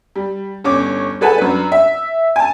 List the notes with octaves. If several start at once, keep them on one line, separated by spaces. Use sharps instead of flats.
G3
G1 C#4 C#5 D6
G#4 A4 B4 F#5 G#5 A5
F#2 D4 B4
E5
G#5 A5